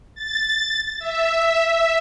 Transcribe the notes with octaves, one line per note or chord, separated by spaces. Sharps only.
A6
E5